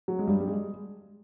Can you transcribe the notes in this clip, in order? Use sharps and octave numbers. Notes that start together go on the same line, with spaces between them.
F#3
G#3
G2 G3
G3
G#3